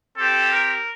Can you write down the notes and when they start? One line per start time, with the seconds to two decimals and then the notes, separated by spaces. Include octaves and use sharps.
0.17 C4 G4 A4
0.53 A#4